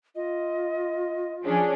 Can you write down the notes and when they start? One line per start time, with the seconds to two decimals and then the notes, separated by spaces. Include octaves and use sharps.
0.16 F4 D#5
1.45 F3 C#4 D4 G#4